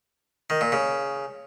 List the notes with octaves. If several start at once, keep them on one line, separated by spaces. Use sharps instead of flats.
D#3
A#2
C#3